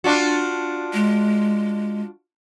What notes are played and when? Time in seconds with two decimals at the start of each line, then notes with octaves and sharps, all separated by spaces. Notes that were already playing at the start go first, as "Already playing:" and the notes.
0.04 D4 F4 F#4
0.93 G#3